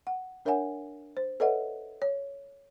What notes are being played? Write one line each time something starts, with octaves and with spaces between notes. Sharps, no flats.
F#5
D4 A#4 C#5 E5 F#5 G#5
C5
A4 B4 C#5 D#5 E5 F#5
C#5